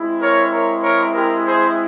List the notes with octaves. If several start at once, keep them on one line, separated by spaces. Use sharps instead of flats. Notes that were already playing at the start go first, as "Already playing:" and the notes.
Already playing: G#3 C4 E4
A#4 C#5
A#4 C#5
A#4 C#5
G4 A#4
G#4 C5